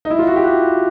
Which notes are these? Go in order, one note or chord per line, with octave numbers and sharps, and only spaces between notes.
D#4
E4
F4
F#4
G4
F#4